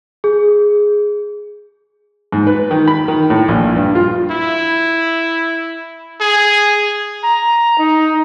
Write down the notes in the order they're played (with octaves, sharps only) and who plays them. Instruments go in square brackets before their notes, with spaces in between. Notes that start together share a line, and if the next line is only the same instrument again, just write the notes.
[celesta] G#4
[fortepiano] G#2
B4
D#3
B5
D#3
A2
A#1
G2
F4
[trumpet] E4
G#4
[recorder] A#5
D#4